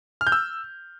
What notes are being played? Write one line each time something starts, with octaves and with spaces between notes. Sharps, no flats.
F6
G6
E6